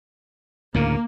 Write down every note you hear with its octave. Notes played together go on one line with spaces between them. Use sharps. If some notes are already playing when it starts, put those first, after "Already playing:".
D2 A2 C#3 A#3